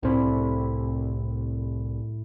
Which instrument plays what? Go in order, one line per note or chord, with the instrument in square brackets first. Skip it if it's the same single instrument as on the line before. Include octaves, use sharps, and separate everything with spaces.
[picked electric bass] C2 C4 [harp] A2 E4